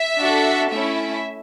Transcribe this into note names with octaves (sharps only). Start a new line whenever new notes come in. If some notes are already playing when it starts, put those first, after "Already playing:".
Already playing: E5
D4 F#4 A4
A3 C#4 E4 E5